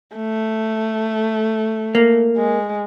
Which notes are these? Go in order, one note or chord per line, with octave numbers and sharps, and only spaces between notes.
A3
A#3
G#3